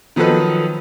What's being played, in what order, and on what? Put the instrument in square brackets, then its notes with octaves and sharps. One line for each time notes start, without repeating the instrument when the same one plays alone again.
[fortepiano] D#3 F3 F#3 D#4 A4 B4